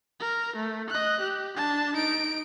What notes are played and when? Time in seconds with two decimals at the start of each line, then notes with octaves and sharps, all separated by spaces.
0.20 A#4
0.56 A3
0.90 D#5 F#6
1.21 G4
1.56 D4 A5
1.95 D#4 D7